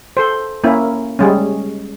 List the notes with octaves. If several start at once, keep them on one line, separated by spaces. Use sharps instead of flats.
A4 C5
A#3 C#4 E4
G3 G#3 C#4